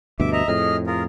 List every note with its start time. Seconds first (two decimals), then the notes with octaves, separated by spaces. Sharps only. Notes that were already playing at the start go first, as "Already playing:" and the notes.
0.20 D2 G2 B2 E5 D6
0.33 D#5 E5 A#5
0.48 F2 A2 G#4 D#5 F6
0.87 F4 G#4 A#4